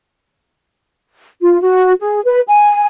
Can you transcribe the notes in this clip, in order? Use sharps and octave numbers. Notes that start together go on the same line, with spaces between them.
F4
F#4
G#4
B4
G#5